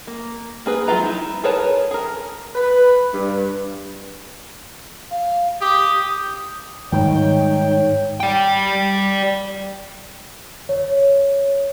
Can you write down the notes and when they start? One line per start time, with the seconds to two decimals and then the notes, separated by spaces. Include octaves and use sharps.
0.07 A#3
0.66 A#3 G#4 B4
0.88 F#3 G#3 F4 F5 A#5
1.03 D#4 E4
1.44 G#4 A#4 B4 C#5 A5
1.91 G#4 A#4
2.56 B4
3.13 G2
5.11 F5
5.61 G4 D#6
6.92 G#2 D#3 G3 D#4 C#5 G5
8.20 D5 G5
10.69 C#5